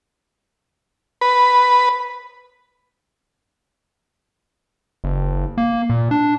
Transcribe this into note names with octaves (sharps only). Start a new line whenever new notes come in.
B4
F#1
A#3
A#2
D4